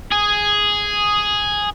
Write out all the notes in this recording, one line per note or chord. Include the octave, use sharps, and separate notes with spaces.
G#4